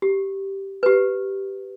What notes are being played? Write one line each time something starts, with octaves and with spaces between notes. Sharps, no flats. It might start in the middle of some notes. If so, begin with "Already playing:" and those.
G4
G4 B4